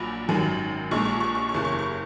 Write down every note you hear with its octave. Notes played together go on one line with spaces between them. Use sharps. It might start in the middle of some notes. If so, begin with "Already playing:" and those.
Already playing: A#1 A#2 F#3 B5
G#1 F#2 D#3 F#3
A#1 A#2 G#3 C#6
C#6
C#6
C#6
C#6
F#1 E2 C#3
C#6
C#6